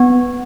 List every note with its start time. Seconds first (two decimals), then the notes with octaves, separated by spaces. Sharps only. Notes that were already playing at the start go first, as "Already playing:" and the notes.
Already playing: B3